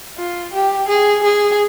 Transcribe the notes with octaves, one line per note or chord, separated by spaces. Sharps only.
F4
G4
G#4
G#4